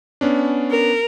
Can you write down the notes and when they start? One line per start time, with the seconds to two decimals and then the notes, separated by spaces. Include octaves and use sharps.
0.21 B3 C#4 D4
0.70 A#4